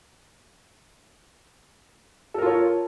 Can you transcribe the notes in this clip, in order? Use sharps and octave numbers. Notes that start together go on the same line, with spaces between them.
F4 A4 A#4 C#5